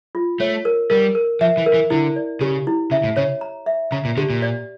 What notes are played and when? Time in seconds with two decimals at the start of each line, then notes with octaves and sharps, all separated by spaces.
0.15 F4
0.40 A3 C#5
0.65 A#4
0.90 G3 A#4
1.15 A#4
1.41 F3 E5
1.57 E3
1.66 A#4
1.74 E3
1.91 D3 E4
2.16 D5
2.41 C#3 G4
2.67 E4
2.91 C#3 E5
3.04 A2
3.17 C#3 C#5
3.41 A#5
3.66 E5
3.92 C#3 A#5
4.05 A#2
4.17 D3 G4
4.30 A#2
4.42 D5